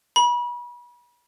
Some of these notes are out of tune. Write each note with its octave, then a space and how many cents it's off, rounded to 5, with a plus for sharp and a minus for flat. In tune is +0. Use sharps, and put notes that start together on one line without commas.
B5 -35